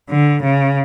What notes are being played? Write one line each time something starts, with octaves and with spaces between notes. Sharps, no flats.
D3
C#3